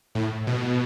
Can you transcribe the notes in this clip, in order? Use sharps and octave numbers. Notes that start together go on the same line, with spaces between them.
A2
B2